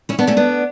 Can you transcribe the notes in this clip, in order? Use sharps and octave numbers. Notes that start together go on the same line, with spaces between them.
C#4 E4
B3 D4
A3 C#4
B3 D4